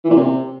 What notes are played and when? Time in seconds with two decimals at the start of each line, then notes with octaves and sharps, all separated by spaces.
0.04 E3
0.10 A#2
0.16 C3